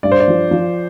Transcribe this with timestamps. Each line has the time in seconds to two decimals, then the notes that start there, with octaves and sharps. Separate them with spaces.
0.03 G2 D5
0.12 C5
0.20 D5
0.28 F3
0.51 F3